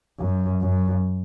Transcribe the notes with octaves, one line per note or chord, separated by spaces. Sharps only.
F#2
F#2